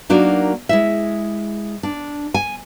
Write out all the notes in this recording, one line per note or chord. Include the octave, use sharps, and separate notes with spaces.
F#3 A#3 D4 D#4 F#4 A#4
G#3 E4 E5
D4
G#5